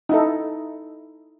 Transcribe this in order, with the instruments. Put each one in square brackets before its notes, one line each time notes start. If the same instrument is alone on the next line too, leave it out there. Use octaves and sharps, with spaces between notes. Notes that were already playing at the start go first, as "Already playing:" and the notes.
[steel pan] D#4 E4 A4